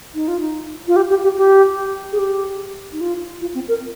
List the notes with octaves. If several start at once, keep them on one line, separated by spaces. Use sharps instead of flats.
D#4
F4
D#4
F4
G4
G4
G4
G4
G#4
G4
D#4
F4
F4
C4
A#4